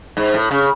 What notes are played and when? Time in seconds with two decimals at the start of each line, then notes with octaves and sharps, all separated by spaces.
0.17 G#2
0.34 A2
0.51 C#3